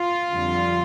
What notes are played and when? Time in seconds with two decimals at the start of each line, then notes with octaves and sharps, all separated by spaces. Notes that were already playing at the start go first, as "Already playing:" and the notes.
Already playing: F4
0.32 F2 D3 G3